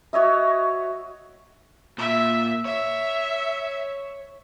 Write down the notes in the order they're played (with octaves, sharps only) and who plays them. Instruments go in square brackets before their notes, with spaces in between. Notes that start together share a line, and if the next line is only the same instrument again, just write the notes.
[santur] F#4 C#5 D#5 E5
[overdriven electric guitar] A#2 [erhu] E5
[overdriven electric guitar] C#5 [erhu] E5